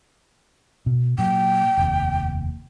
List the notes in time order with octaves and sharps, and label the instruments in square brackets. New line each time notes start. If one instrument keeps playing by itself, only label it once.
[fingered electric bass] B2
[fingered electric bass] A#2 F#3 A#3 [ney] G5
[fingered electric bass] F1 D#2